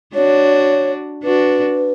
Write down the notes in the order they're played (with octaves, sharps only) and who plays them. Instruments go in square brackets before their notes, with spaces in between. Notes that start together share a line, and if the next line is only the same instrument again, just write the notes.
[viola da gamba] D4 F#4 [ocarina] C#5
[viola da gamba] D4 F#4 [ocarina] B4